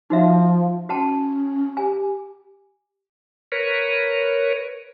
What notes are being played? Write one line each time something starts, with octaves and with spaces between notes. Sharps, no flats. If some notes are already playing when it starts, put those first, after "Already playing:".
F3 D#4 F#4 E5
C#4 F#4 G5 A5
G4 G#5
A#4 B4 C#5